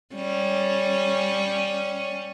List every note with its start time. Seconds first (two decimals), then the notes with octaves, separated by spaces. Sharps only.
0.15 G3 C#4